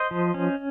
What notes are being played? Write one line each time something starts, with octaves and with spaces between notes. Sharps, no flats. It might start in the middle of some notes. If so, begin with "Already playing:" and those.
Already playing: C5 D#5
F3
C#4